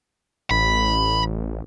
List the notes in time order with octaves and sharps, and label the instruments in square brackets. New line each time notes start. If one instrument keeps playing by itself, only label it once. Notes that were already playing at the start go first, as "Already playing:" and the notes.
[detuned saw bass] A1 [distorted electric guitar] B5